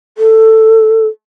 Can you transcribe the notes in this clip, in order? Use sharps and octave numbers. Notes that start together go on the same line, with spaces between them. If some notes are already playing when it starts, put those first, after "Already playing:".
A4